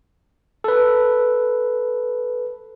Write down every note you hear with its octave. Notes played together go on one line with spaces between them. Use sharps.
A4 B4